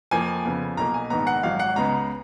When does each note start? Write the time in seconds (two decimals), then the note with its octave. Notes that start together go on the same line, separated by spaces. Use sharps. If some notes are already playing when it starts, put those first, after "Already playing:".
0.11 F2 F3 A#3 G#5
0.45 F2 C#3 F3 B3
0.77 B1 B2 A#3 A#5
0.94 G#5
1.10 A#1 G#2 D#3 G#3 B3 A#5
1.27 F#5
1.43 G#1 G#2 F#3 F5
1.60 F#5
1.76 C#2 C#3 G#3 B3 A#5